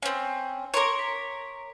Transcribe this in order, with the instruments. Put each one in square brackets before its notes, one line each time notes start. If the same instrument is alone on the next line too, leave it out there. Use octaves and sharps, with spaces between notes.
[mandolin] C4 C#4
[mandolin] A#4 C#5 [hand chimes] A#5 C6 D6
[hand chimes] B6